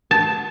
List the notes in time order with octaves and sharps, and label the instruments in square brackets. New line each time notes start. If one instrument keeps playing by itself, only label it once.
[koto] A5